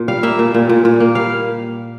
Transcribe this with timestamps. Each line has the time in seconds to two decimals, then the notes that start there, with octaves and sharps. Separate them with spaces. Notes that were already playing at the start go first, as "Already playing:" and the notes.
Already playing: A#2
0.08 G3 F5
0.23 A#3 E5
0.39 A#2
0.54 A#2
0.69 A#2
0.85 A#2
1.00 A#3
1.15 G3 F5